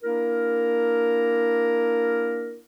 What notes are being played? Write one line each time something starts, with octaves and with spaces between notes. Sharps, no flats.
A#3 D4 E4 A#4